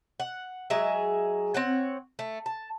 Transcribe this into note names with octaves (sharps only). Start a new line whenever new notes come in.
F#5
F#3 G#3 G#4 E5
C4 C#5 F#5
A3
A5